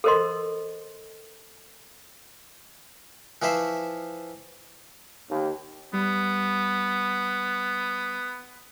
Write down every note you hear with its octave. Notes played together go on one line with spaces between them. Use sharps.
A4 A#4 C5 D#5 C6
E3 F3 C5 E5
D#2
G3 B3